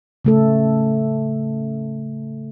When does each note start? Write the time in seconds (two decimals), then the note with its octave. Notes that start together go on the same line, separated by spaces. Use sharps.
0.25 C#3 A3 A4